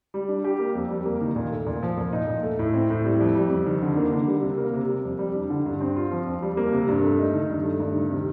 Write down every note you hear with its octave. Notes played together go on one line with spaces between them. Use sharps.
G3
D4
G4
A#3
F2
G3
A#3
D#3
A#2
A3
A#2
F3
A#2
D#4
A#2
A3
A2
C4
A2
G3
F2
G3
F2
D#3
D3
A#3
D3
G3
C3
A#3
C3
G3
F2
G3
D4
D3
G2
C4
F4
F3
F2
G3
A#3
C3
G2
A3
D#4
D#3
G2
A3
G2
D#3
C3